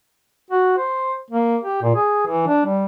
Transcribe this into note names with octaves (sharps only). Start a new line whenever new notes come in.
F#4
C5
A#3
G4
A#2
G#4
E3
D4
G3